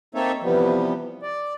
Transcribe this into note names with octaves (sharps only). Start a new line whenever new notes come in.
A#3 C4 D#4 A4 C#5 E5
C3 E3 F3 G3 B3
D5